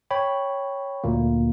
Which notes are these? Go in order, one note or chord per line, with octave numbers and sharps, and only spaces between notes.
C#5 G5 B5
D2 A#2 A#3